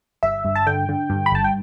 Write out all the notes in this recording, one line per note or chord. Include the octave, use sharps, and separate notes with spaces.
G1 E5
G2
A5
D3 G5
D3
G2
B5
G1 A5
G5